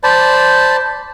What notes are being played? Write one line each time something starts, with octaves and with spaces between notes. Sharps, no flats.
C5 D5 A5 B5